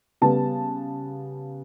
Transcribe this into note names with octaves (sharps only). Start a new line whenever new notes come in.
C#3 G3 B3 A5